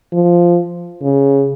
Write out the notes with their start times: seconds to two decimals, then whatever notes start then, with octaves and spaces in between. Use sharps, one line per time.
0.13 F3
1.03 C#3